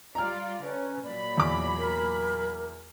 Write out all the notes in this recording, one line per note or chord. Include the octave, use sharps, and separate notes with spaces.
G3 F4 D5 A#5 F6
D3 C#4 B4
A#2 F#3 D5 B5
E2 D6
A#4